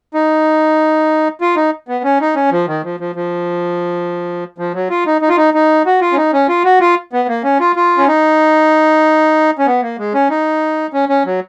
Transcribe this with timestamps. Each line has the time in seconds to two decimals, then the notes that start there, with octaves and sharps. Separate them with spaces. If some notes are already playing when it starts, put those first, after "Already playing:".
0.14 D#4
1.41 F4
1.56 D#4
1.88 B3
2.04 C#4
2.21 D#4
2.36 C#4
2.52 F3
2.67 D#3
2.84 F3
3.00 F3
3.15 F3
4.58 F3
4.74 F#3
4.90 F4
5.06 D#4
5.21 D#4
5.29 F4
5.37 D#4
5.54 D#4
5.86 F#4
6.01 F4
6.12 C#4
6.17 D#4
6.33 C#4
6.49 F4
6.65 F#4
6.80 F4
7.13 B3
7.28 A#3
7.44 C#4
7.60 F4
7.76 F4
7.98 C#4
8.08 D#4
9.59 C#4
9.67 B3
9.82 A#3
9.99 G#3
10.14 C#4
10.30 D#4
10.93 C#4
11.09 C#4
11.26 F#3